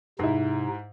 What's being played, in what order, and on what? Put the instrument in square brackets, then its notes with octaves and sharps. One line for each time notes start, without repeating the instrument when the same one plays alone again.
[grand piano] G#2 E4 [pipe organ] C3 D#4